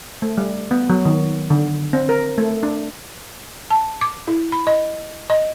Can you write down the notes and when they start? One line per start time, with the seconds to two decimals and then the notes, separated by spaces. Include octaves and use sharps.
0.22 A3
0.38 G3
0.71 B3
0.90 F#3
1.05 D#3
1.50 D3
1.93 C4
2.09 A#4
2.38 A3
2.63 D4
3.71 A5
4.01 D6
4.27 E4
4.52 B5
4.67 D#5
5.30 D#5